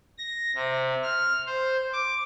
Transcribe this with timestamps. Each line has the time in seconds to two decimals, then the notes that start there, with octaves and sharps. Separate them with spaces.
0.18 A#6
0.55 C3
1.03 F6
1.47 C5
1.93 D6